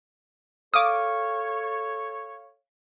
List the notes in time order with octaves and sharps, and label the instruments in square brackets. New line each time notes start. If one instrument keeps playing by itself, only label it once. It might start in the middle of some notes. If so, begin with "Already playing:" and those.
[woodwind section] A4 C#5 [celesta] F5 F6 [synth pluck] D6 D#6